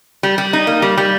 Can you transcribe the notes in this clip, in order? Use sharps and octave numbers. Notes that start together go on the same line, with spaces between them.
G3
G3
D#4
A#3
G3
G3